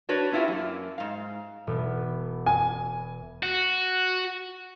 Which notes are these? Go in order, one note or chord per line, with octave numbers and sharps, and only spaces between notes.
D4 F#4 B4 C#5
B3 C#4 E4 F4 G4
F#2 A#3
G#2 F5
E1 B3
G#5
F#4